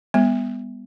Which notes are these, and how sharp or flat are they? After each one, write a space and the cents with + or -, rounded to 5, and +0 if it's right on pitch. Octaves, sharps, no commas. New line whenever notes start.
G3 +40 B3 +0